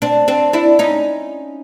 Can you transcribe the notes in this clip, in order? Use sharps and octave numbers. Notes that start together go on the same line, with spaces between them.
C4 D4
C4 D4
D4 E4
C#4 D#4